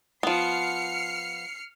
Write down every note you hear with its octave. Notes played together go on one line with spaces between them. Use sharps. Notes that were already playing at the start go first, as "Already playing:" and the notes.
F3 B3 F6 C7 C#7